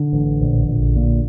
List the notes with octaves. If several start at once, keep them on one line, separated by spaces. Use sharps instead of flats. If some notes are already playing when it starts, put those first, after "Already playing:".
Already playing: D3
A1
A#1
A#1
A#2